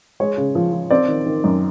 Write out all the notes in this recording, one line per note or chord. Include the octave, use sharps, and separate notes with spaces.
G#3 C#5
C#3
F3
F3
C4 D5
D#3
D#3
F#2